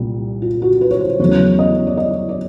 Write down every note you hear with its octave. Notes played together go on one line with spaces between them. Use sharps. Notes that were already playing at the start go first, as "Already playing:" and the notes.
Already playing: C2 A#2 G3
F4
F#4
B4
C#5
C5
E2 C#3 F#3 A3 C#5
D#5
D5
D#5
D5